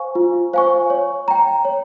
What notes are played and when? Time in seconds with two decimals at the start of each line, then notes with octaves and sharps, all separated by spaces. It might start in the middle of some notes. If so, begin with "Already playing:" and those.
Already playing: C5 F5 G#5 C#6
0.15 F4
0.53 C5 F5 G#5 C#6
0.90 C#5
1.28 G5 A#5
1.65 C#5